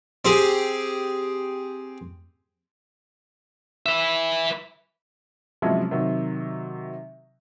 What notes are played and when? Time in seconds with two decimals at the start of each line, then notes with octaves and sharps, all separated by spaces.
0.25 C4 G4 G#4
3.86 B4 E5
5.62 C3 F3 F#3 G#3 C#4 E4
5.91 C3 D#3 F#3